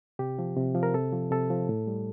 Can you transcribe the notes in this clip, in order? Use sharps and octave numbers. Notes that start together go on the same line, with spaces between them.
C3 G4
F3
C3
F3
A#4
C3 A4
F3
C3 A4
F3
A2
G3